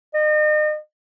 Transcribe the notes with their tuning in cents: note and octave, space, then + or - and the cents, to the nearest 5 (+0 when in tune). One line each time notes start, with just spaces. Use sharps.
D#5 -40